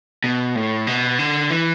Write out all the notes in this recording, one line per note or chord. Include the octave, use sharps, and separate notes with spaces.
B2
A2
B2
D3
E3